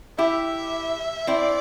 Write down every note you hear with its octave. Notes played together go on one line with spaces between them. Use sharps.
E4 G4 E5
C4 E4 D5